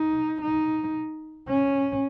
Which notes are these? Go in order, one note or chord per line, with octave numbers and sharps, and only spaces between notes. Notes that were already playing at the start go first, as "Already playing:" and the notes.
Already playing: D#4
D#4
C#4